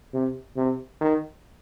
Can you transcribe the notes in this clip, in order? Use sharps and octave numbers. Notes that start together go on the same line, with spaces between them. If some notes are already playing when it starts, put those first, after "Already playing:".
C3
C3
D#3